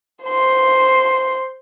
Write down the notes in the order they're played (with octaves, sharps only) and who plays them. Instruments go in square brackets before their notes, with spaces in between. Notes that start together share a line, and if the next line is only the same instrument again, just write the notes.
[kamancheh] C5 C6